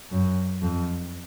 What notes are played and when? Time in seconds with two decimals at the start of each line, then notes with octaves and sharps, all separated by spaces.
0.11 F#2
0.62 F2